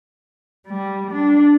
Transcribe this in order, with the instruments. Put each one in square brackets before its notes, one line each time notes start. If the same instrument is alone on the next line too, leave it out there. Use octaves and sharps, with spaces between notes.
[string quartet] G3
D4